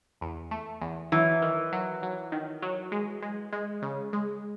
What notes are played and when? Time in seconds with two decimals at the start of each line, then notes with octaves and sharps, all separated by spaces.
0.21 E2
0.51 A3
0.81 E2
1.12 E3 F#3
1.42 D#3
1.73 F#3
2.03 F#3
2.32 D#3
2.62 F#3
2.92 G#3
3.22 G#3
3.53 G#3
3.82 C#3
4.13 G#3